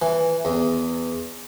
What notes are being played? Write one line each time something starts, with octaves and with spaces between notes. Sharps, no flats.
E3
E2